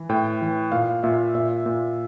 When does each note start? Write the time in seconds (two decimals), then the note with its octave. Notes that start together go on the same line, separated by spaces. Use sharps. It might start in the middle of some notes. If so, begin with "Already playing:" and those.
Already playing: E3
0.09 A2 G5
0.42 E3
0.72 A#2 F5
1.03 A#2 E5
1.35 A#2 E5
1.66 A#2